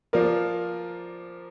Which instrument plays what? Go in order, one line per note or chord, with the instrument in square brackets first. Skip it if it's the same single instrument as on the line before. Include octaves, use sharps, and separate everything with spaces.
[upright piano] F3 A#3 F4 A#4 D5